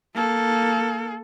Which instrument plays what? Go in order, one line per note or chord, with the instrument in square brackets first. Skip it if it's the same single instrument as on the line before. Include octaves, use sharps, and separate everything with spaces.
[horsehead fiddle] A#3 A4